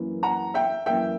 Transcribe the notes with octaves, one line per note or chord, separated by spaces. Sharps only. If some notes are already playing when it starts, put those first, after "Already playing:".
Already playing: F#2 E3 A#3
F#5 A#5
E5 G5
F#2 E3 A#3 E5 G5